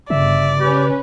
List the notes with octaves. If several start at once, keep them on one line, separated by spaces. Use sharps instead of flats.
G1 C#3 D5 E5
C#4 G4 B4